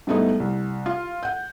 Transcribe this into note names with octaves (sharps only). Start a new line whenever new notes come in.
G#2 G3 A3 B3 D#4 E4
C2
F4
F#5 G6